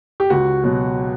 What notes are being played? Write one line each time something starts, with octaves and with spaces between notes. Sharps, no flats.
G4
C#2 F#4
B2 F#3